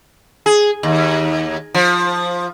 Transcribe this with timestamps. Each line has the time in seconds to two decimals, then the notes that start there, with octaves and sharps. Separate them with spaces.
0.46 G#4
0.83 D#2
1.74 F3